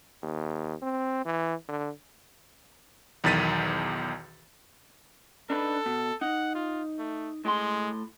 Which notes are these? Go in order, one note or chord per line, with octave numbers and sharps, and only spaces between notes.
D#2
C4
E3
D3
B1 E2 D#3 A6 B6 D#7
D4 D#4 A4 B4
B2
D#4 F#5
F4
A3
A2 G#3 C6